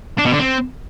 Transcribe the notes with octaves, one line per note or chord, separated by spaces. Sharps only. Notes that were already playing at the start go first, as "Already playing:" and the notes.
D4
B2
D3
C4